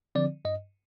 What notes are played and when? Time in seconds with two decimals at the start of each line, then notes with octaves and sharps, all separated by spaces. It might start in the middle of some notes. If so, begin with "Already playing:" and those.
0.15 D3 F3 C4 D5
0.45 G2 D#5